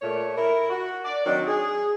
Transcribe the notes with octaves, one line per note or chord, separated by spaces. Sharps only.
A#2 A3 C#5
E4 A#4
F#4
D5
D#3 F#3 C4 D4 D#4 A#4
G#4